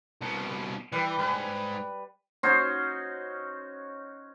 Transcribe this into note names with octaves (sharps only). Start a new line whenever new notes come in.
C2 B2
E3 G3 B4
G#2 B4
C#4 D#4 F#4 C5